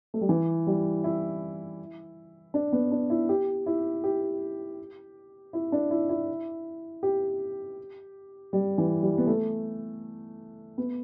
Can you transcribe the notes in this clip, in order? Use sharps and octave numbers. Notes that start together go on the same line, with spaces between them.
A3
G3
E3
G3
E4
D4
B3
D4
E4
G4
E4
G4
E4
D4
E4
E4
G4
G3
E3
G3
B3
A3
B3